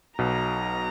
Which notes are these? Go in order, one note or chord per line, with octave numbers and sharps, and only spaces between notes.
B1 B2 A#5